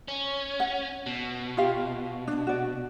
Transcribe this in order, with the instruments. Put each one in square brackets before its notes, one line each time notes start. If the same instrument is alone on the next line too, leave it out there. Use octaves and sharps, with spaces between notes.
[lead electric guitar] C#4
[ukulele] F#5
[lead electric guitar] B2
[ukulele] F4 G4 F5
D4
F#4 D5